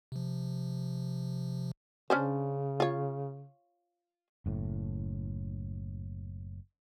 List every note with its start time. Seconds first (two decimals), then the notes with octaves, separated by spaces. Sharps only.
0.12 C3 F3
2.10 C#3 C#4 D4 C5
2.80 F4 C#5
4.46 F#1 A2